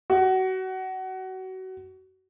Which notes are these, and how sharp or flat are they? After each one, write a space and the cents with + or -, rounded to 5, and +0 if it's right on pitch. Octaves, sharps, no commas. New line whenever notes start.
F#4 +25